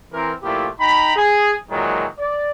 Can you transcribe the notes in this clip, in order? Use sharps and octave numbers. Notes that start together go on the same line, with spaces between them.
E3 C4 A#4
A#2 F3 A3 E4 F4 G4
D#4 G5 A#5 B5
G#4
A#2 D#3 E3 F#3 G#3
D5